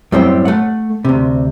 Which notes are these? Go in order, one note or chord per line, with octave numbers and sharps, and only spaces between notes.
F#2 A2 G3 C4 G5
A3 F#5
D2 C3